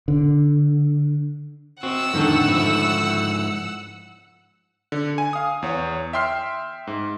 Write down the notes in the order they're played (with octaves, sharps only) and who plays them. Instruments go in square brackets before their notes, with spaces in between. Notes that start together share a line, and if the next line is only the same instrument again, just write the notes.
[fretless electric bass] D3
[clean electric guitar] C4 F#4 [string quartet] F#5 E6
[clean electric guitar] F2 A2 A4 [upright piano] D3 D#3 [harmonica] A3
[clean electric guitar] G#2 F3 E4
[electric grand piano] D3
G#5
F5 D#6
E2 C#5
E5 G5 C6 F6 C7
G#2